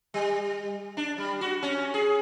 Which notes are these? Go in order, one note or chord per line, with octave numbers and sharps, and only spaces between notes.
G3
D4
G3
F#4
C#4
G#4